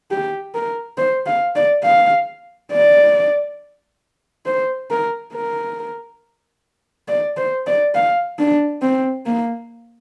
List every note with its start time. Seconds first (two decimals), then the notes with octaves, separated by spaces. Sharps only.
0.11 G4
0.54 A#4
0.98 C5
1.26 F5
1.56 D5
1.84 F5
2.73 D5
4.46 C5
4.91 A#4
5.34 A#4
7.08 D5
7.37 C5
7.67 D5
7.95 F5
8.39 D4
8.82 C4
9.26 A#3